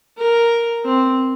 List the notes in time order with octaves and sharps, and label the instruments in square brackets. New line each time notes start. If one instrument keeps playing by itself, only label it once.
[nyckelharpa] A#4
C4